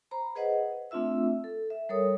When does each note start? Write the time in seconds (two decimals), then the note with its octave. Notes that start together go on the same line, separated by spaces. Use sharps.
0.11 C5 A#5 B5
0.36 G#4 B4 C5 D#5 F#5
0.91 A3 C4 D4 F4 E5 E6
1.44 A4
1.70 E5
1.89 G3 A4 A#4 C#5 D#6